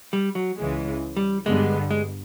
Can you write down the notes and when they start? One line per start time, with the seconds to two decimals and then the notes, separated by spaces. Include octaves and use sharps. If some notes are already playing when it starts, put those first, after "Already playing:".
0.13 G3
0.35 F#3
0.57 C#2 C#3 E3 G#3
1.17 G3
1.46 G2 D3 G3 G#3 B3
1.91 G#3